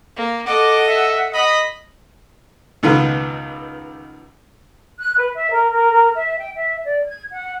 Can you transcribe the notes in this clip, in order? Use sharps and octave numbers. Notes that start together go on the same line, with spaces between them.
A#3
A4 D#5 F#5 D6
E5
D#5 B5
C#2 B2 D#3 F4 B4
F#6
B4
E5
A#4
A#4
A#4
E5
G5
E5
D5
G#6
F#5